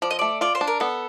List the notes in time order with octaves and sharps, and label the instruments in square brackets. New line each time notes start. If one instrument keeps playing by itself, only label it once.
[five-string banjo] F3 [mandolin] D5
[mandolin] D#5
[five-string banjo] A3 [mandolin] D5
[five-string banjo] F4 [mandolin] D5
[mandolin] C5
[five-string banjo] D4
[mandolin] A#4
[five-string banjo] B3 [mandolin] A4